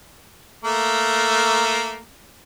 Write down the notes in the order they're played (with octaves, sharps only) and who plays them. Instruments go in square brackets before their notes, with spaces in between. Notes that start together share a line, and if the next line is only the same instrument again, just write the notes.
[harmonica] A3 A#3